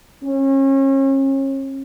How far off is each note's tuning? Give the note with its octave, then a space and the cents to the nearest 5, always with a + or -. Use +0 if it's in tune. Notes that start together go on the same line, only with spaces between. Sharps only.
C#4 -35